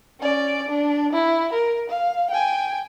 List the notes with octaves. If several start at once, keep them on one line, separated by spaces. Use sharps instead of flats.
C#4 D5
D4
E4
A#4
F5
G5 G#5